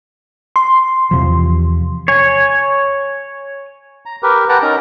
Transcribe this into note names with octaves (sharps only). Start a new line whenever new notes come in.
C6
E2 C3 F3
C#5 G#5
A#5
G4 A#4 B4
B4 F#5 G5 A5 A#5
C#4 D#4 A#4 A#5